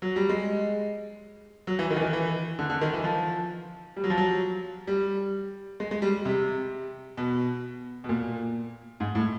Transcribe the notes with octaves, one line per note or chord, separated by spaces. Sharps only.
F#3
G3
G#3
F#3
E3
D#3
E3
D#3
E3
D3
D3
D#3
E3
F3
G3
F#3
F3
F#3
G3
G#3
G#3
G3
C3
B2
B2
A#2
G#2
A2